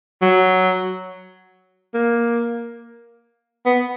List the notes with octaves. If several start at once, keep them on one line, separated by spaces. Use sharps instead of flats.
F#3
A#3
B3